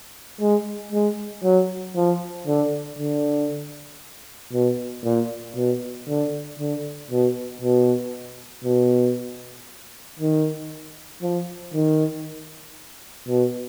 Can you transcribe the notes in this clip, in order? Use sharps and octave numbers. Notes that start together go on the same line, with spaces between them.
G#3
G#3
F#3
F3
D3
D3
B2
A#2
B2
D3
D3
B2
B2
B2
D#3
F3
D#3
B2